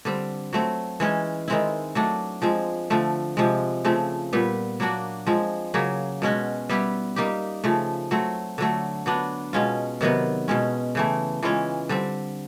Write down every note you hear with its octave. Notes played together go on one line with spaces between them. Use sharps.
D3 G3 C4
F#3 A3 C4
E3 G#3 C#4
D#3 G#3 C4 E4
F#3 A3 D4
F3 G#3 C4
D3 F3 A3
C3 F3 G#3
C#3 F3 A3 C4
A#2 G3 B3
F#3 A#3 D4 F#4
F3 G#3 C4
C#3 F#3 A#3
B2 G#3 C#4 F#4
G3 B3 E4 G4
G3 A#3 D#4 G4
C#3 F3 A3
F#3 A3 C4
D3 F#3 A3
F#3 B3 D4
B2 G#3 C#4 F4
C3 D#3 F#3 B3
B2 G#3 C#4
C#3 E3 A3
E3 G#3 C#4 F4
D3 G3 C4